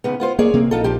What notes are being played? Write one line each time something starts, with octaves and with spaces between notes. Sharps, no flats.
D#2 C#3 B3
B3 F4 C5
A#3 G#4 C#5 D5
C3 A#3 C4
A#1 D#4 F4 A4
D#2 F3 G4